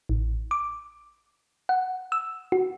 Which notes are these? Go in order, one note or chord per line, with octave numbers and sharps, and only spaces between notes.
A1
D6
F#5
E6
F#4